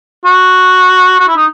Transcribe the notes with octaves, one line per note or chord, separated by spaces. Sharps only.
F#4
F#4
E4
D#4